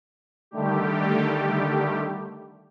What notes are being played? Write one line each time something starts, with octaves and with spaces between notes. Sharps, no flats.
D3 D#3 G3 A3 G4